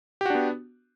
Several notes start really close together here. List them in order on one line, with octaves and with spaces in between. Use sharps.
G4 F#4 D4 B3